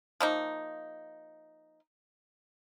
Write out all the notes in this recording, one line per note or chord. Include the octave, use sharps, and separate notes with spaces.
F3 A#3 D#4